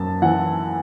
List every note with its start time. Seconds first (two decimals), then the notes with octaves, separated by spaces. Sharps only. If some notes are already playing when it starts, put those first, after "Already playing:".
Already playing: F#2 A5
0.22 E3 F#5